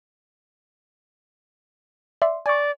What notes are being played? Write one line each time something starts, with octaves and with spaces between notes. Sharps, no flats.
D5 E5 C6
D5 G#5 C#6